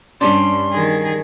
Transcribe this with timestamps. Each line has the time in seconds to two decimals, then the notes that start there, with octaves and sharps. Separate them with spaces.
0.21 G2 G3 C#4 D4 C6
0.71 D#3 G#4